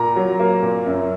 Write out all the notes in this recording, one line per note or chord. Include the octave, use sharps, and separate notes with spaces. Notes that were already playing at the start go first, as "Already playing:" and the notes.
Already playing: A#2 A#5
F#3
A#3
A#2
F#2